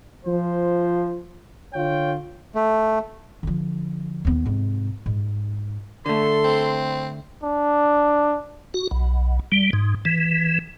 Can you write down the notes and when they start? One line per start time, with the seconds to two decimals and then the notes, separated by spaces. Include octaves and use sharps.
0.25 F3 C5
1.74 D3 F4 C#5 G5
2.55 A3
3.43 D3 F3
4.25 D#2 B3
4.46 G#2 C3
5.06 G#2
6.06 D3 A3 A4 C6
6.44 C4
7.43 D4
8.74 F#4
8.91 B1
9.52 G3
9.73 G#2
10.05 E3